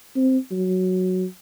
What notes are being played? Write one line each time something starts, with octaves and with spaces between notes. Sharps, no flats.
C4
F#3